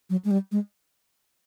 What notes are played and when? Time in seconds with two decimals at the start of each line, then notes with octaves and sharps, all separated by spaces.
0.10 F#3
0.25 G#3
0.31 G3
0.52 G#3